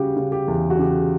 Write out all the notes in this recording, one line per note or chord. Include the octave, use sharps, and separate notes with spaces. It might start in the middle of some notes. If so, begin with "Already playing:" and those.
Already playing: C#3 G3 F#4 G4
C#3
G4
E2
F#4
C#3 G4